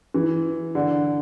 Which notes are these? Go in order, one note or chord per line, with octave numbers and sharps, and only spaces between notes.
E3
D3